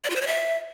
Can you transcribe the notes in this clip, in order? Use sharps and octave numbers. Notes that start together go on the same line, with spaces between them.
D5
F4
C5
C#5
E5